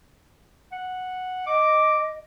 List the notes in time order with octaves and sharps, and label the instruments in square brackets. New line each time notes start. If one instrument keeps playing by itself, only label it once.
[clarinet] F#5
[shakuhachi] D#5 [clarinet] D6